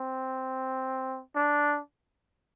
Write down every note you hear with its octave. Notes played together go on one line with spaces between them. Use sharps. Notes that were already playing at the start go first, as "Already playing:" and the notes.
Already playing: C4
D4